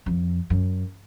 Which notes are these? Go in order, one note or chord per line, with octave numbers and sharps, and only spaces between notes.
F2
F#2